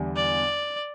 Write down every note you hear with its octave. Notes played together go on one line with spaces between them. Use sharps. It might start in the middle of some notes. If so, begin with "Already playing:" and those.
Already playing: E2 D3 G3 D4
D5